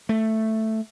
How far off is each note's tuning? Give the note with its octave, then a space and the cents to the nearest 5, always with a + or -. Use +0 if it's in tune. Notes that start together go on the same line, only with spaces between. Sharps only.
A3 +5